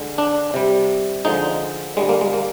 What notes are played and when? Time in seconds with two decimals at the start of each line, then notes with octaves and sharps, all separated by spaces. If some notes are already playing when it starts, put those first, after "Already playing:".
Already playing: D3 G#3
0.18 D4
0.54 C3 G3
1.25 D3 F3 G#3 D#4
1.97 D3 G3 G#3
2.09 A#3
2.21 G#3
2.33 A#3